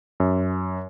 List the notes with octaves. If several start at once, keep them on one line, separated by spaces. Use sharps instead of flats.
F#2